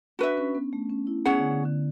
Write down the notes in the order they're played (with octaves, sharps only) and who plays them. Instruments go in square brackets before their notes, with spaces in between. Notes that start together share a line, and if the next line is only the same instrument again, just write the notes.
[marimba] D4 [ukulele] F#4 B4 E5
[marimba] C#4
B3
A3
C#4
E4
[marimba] B3 [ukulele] C#4 G#4 C#5 F#5
[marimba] D3
D3
D3